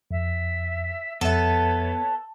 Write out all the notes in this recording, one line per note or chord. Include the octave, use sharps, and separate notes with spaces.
F2 E5
F2 B3 A4 B4 C#5 E5